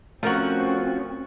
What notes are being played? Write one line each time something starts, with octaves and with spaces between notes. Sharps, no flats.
F3 A3 C4 C#4 F#4 A#4